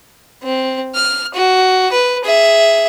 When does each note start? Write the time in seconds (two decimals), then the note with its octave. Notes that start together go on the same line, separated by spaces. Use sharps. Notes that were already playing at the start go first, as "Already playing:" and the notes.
0.42 C4
0.95 F6
1.34 F#4
1.92 B4
2.25 G#4 E5